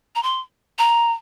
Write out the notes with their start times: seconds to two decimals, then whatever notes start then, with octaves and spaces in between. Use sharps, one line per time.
0.15 A#5
0.23 C6
0.78 A#5